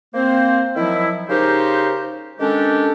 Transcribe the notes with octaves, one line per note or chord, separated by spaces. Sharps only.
A#3 C4 C5
D#3 F3 F#3 E4
C#3 D#4 G4 A#4 C5
D#3 G#3 C#4 D4 G4 A4